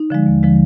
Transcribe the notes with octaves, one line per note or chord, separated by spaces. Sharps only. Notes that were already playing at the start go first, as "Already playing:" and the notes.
Already playing: D#4
D3 F3 G#3
D#2
D3 F3 G#3